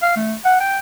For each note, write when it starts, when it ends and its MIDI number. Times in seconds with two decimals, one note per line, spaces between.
0.02 0.15 77
0.16 0.34 57
0.45 0.58 78
0.60 0.78 79